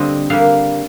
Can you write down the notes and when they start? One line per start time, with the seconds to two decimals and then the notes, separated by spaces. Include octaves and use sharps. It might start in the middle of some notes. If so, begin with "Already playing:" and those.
Already playing: D3 G3 A#3 C4 D#5
0.30 D3 G3 A#3 F5